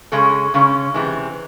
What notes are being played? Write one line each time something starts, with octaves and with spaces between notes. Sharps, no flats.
C#3 G#3 C#4 A4
C#3 G#3 C#4
C3 E3 G#3